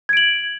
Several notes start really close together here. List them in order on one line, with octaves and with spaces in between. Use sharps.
G#6 D7 F#7